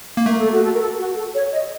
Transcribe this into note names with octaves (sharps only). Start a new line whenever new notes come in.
A#3
A3 A#4
A4
F#4
A4
A#4
A4
F#4
A4
C#5
D#5